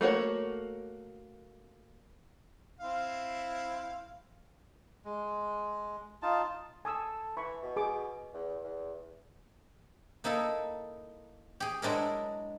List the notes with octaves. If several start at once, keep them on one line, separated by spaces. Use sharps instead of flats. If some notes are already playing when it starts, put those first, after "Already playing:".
A3 A#3 F#4 C#5
C4 E4 F5
G#3
D#4 F4 A5
A4 G#5 D#6 E6
E3 B5 C#6
B2
G#4 D6
E2
E2
A#3 D#4 E4 A4
G4 G#4
F#3 G#3 D4 E4 A#4